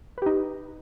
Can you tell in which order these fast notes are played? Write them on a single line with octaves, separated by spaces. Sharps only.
B4 G4 D#4